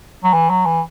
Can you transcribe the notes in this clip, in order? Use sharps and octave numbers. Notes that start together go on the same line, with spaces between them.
F#3
E3
F#3
E3